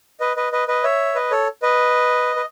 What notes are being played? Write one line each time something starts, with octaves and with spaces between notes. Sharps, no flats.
B4 D#5
B4 D#5
B4 D#5
B4 D#5
C#5 E5
B4 D#5
A4 C#5
B4 D#5
B4